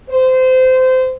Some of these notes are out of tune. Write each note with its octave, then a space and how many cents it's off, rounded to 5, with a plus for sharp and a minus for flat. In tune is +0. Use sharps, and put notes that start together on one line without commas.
C5 -25